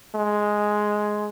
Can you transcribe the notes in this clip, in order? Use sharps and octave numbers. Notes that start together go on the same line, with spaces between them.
G#3